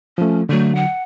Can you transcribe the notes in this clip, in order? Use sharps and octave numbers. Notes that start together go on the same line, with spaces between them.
F3 A3 C#4
D3 F#3 A3
F#5